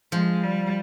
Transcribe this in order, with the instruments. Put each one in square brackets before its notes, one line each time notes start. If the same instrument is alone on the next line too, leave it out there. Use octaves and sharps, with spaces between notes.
[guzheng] F3 [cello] G#3
[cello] G3